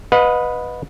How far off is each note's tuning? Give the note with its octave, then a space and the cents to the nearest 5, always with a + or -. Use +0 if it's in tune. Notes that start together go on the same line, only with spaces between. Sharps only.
B4 +0 D#5 +0 F#5 -45